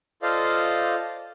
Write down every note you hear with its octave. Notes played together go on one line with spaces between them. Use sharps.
F4 A4 C5 D5 D#5 F5